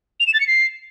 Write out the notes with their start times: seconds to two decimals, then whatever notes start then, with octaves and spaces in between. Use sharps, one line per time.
0.20 F7
0.27 E7
0.34 A6
0.40 C#7
0.47 C7